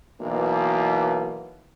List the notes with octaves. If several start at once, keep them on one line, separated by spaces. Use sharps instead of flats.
B1 B2 E3 A#3